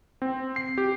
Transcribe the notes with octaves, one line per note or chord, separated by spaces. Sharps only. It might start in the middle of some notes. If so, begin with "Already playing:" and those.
C4
C7
G4